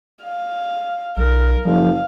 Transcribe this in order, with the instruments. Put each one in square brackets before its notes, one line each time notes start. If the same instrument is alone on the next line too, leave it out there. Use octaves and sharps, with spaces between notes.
[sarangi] F5
[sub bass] B1 [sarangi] A#4
[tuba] F#1 [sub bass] F3 [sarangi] F5